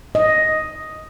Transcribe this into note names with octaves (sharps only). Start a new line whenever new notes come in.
D#5